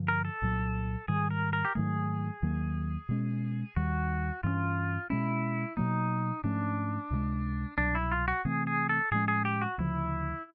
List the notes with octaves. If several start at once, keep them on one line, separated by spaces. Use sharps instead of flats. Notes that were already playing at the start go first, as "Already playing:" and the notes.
Already playing: G2 D3 F3
A#4
A4
C2 A#2 F#3
G#2 D#3 G3 G#4
A#4
A#4
G4
G#2 D#3 F#3 A3 G#4
D#2 D#3 F#3 A#3
B2 G#3 C#4
D#2 D#3 G3 F#4
G2 E3 A3 C#4 F4
B2 G#3 C#4 E4
B2 F#3 A#3 D#4
G#2 F3 A3 C#4 D4
C#2 C3 E3 G#3
C2 B2 F#3 D4
E4
F4
F#4
C3 E3 A3 C4 G#4
G#4
A4
A2 F3 G#3 C#4 G#4
G#4
G4
F#4
D2 C#3 F3 E4